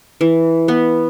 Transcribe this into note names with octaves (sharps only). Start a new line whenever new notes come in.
E3
B3